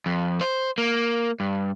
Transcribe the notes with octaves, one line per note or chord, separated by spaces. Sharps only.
F2
C5
A#3
G2